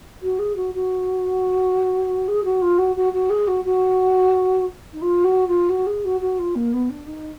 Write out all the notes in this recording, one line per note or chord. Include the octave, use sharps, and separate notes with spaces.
F#4
G#4
F#4
F#4
G#4
F#4
F4
F#4
F#4
F#4
G#4
F#4
F#4
D#4
F4
F#4
F4
F#4
G#4
F#4
F#4
F4
A#3
B3
D4
D#4